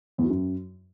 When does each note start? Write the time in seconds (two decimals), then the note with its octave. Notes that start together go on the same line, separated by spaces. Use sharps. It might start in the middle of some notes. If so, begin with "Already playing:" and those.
0.18 E2
0.24 F#3
0.30 F#2